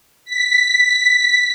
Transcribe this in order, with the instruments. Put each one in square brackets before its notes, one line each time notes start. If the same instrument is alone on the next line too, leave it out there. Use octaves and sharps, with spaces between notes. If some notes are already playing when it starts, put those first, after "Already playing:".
[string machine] B6